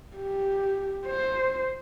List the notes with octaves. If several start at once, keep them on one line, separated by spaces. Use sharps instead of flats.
G4
C5